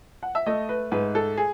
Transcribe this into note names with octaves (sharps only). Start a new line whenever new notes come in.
F#5
E5
A3 D#5
B4
G#2 B4
A4
G#4